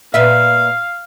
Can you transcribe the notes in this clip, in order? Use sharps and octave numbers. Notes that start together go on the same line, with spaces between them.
A#2 B4 E5 F5